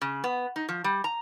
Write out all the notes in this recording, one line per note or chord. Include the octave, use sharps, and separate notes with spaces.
C#3
B3
D#4
F3
G3
A#5